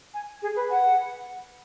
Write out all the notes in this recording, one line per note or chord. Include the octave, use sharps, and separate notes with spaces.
G#5
G#4
B4
F#5